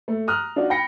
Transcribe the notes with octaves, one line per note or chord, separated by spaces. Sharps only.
A3
A#5 D#6 F6 F#6
D4 D#4 F4 F#4 D5
G5 B5 A#6 C#7